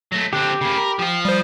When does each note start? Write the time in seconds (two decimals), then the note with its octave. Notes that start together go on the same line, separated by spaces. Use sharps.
0.12 F#3 A3 A#6
0.33 D3 C4 G4 F#6
0.61 C#3 A#3 B5
0.77 A#4
0.99 F3 F4 G5
1.25 G3 C5 D#6